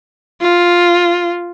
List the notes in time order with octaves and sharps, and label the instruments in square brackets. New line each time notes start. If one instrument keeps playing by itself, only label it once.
[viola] F4